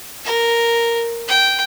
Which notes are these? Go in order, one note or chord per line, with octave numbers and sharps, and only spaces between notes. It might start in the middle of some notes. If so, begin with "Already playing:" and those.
A#4
G5